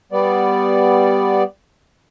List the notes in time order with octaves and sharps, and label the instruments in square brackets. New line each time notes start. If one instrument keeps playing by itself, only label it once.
[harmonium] G3 B3 D5